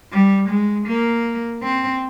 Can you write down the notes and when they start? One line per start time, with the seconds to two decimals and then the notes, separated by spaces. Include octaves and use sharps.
0.12 G3
0.49 G#3
0.87 A#3
1.63 C4